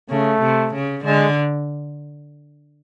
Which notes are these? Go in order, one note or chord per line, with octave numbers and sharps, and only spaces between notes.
C#3 A3
C3
C#3
D3 G#3